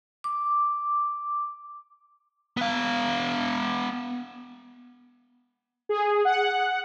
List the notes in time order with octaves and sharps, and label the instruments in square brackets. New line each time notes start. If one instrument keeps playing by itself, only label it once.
[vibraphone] D6
[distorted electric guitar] B3 F5
[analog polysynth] G#4
F#5